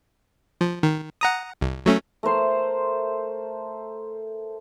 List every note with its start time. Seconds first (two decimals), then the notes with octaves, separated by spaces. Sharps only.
0.61 F3
0.83 D#3
1.21 F#5 A#5 D#6
1.61 C2
1.86 F#3 A3 C#4
2.23 A3 A#4 C5 C6